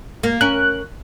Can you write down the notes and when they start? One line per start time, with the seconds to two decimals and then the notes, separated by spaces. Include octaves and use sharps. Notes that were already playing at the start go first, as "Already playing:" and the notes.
0.23 A#3
0.41 C#4 A#4 F#6